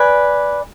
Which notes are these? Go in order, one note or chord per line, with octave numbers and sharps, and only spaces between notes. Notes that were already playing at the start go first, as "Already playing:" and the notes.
Already playing: B4 D5 G#5